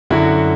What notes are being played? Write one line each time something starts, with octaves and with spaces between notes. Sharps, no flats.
F#2 D3 F#3 E4 F#4